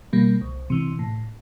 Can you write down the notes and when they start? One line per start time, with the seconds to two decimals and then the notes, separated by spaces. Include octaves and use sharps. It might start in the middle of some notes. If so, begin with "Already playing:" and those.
0.13 B2 G3 A#3
0.41 C2
0.70 C3 E3
0.99 A2